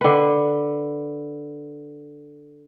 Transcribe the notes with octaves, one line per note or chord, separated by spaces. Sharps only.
D3 B4